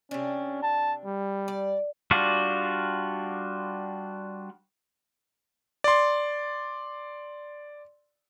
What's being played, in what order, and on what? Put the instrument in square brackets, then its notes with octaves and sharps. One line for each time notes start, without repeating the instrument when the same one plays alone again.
[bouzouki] C3 D4 [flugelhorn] C#4
[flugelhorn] A5
G3
[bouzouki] D5
[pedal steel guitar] G3 D4 F4 F#4
[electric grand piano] D5 C6